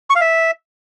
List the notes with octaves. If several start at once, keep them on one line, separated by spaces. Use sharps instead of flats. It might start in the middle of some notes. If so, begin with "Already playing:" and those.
C#6
F5
E5